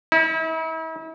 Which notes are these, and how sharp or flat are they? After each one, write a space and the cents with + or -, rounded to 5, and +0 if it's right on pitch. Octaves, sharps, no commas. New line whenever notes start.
E4 -40